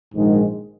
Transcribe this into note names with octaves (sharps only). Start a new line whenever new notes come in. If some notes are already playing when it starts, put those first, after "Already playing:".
A#1 G#2 D#3 G#3